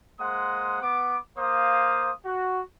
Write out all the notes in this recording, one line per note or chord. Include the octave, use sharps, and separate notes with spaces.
G#3 A#3 C5 F#5 D#6
B3 D6
A#3 C5 F5 D#6
F#4